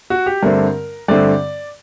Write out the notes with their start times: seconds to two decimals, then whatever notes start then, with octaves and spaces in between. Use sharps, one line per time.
0.10 F#4
0.26 G4
0.43 G2 D3 A3 C4 A#4
1.08 G2 D3 A3 C4 D5